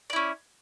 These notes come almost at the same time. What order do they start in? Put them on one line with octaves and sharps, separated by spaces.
D5 E4 C#4